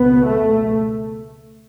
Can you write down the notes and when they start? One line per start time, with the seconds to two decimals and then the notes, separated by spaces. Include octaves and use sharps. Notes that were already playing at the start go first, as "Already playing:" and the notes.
Already playing: C#2 B2 B3
0.27 A3